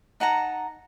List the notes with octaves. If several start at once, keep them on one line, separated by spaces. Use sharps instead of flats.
D#4 F#5 A5 A#5